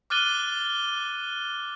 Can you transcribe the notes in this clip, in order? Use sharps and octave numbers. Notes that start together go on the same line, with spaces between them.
D6 F6 F#6 A6 D#7 G7